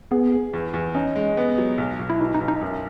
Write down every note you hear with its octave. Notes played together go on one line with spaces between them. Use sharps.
B3 G#4
G#4
E2
E2
C#4 D#4
G#3
B3
F#3
B1
B1
E4
B2 D#4
D#4
B1
D#4
F#2